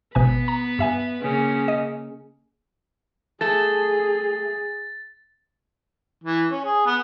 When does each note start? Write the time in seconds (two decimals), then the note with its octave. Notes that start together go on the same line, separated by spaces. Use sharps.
0.15 G#1 B2 B3 B4 G#5
0.48 A#5
0.79 G2 E5 G#5
1.22 C#3 A#3 C#4
1.68 D#5
3.41 A3 G#4 A4 A6
6.24 E3
6.51 C#4
6.65 G#4
6.86 B3